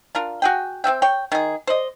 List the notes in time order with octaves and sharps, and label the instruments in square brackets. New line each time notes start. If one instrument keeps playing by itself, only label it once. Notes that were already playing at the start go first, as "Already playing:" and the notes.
[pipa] D4 F4 A#4
F#4 G#4 G5
C4 F#4 E5 G5
C#5 G5
D#3 G#4
C5 D5 D#5